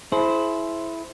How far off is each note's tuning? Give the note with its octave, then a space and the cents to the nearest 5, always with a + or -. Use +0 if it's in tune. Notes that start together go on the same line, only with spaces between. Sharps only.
E4 +5 G#4 +45 C5 +0